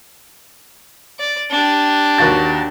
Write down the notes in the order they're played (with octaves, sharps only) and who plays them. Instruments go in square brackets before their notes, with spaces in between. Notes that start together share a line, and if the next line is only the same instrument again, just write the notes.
[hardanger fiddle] D5
D4 G4
[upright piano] D#2 F#4 A6